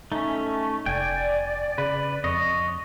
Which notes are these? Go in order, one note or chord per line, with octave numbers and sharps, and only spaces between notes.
A3 C#4 D#4 E5
F1 D5 G5 G#5
C#3 B4
F2 C#5 D#5